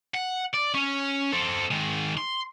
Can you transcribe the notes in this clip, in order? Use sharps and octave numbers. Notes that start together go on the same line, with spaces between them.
F#5
D5
C#4
C4 A4
D#3 G#3
C6